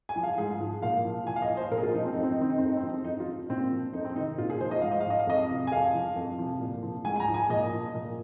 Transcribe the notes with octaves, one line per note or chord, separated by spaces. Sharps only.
G#5
F3
F5
G#2 G#4
F3
A#2 F5
F3
A#2 G#5
F5
D#5
F3
C5
A#2 A#4
G#4
F4
F3 D#4
C4
F2 D#4
C4
D#4
D#3 C4
D#4
F2 C4
D#4
C4
F3
F2 D#4
F4
F3
A#2 C4
F3
F2 D#4
C4
C3 D#3 D#4
A#2 F4
G#4
F3 C5
D#5
G#2 F5
D#5
F5
F3 D#5
F5
F2 D#5
C3 F3
G#5
F2 F5
F3
F2
C3 F3
A#2
F3
G#2 G#5
G#5
A#5
F3
G#5
A#2 D#5
F3
A#2